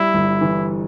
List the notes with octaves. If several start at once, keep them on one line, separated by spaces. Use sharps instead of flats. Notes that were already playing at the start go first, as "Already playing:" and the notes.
Already playing: G3 E4
G1
E3